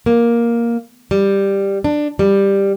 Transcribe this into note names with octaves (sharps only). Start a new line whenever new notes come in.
A#3
G3
D4
G3